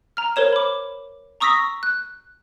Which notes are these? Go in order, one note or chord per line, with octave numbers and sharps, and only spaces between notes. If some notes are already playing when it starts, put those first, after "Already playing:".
A#5 F6
A#4 C5 C#5 E7
B5 D6
A#5 C#6 D#6 E6 A#6 B6
F#6